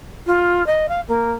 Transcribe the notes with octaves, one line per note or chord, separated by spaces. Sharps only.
F4
D#5
F5
A#3